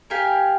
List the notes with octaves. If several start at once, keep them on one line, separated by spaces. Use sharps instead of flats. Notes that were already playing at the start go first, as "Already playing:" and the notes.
G4 A#4 F5 G#5